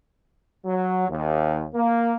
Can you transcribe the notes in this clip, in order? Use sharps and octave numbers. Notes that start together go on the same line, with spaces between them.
F#3
D#2
A#3